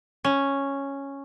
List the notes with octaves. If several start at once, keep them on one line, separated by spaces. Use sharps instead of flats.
C#4